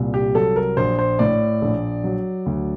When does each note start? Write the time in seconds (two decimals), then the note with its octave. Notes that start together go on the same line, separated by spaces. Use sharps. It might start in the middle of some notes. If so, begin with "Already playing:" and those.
Already playing: C2 A#2
0.14 G4
0.35 F#3 A4
0.56 A#4
0.77 A#1 C5
0.99 C5
1.19 A2 D5
1.62 A#1
2.04 F#3
2.46 D2